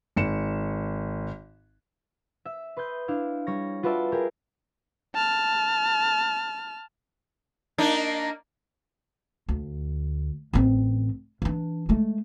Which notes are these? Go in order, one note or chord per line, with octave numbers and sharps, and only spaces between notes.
G#1 C#7 E7
E5
B4 C6 D#6 G6
D4 E4 F5
G3 C#5 A#6
F4 F#4 B4 D5 E5 A5
G4 G#4 A#4
A5 F6
A#3 D4 D#4
D2
A1 C4
E3 D4
G#3 A3